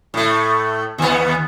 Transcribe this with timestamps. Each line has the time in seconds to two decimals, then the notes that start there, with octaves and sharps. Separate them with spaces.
0.14 A2 A3
0.98 D#2 B3